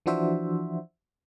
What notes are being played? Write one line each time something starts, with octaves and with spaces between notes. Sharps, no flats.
E3 F3 D4 F#4 C5 E5